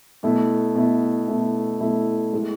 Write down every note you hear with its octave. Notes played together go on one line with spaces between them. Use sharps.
B2 A3 E4
B2 A3 E4
B2 A3 E4
B2 A3 E4
A2 G#3